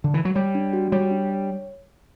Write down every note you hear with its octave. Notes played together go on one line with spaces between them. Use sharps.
D3
E3
F#3
G3 C#5
D4
F#4
G3 C#5
D4
C#5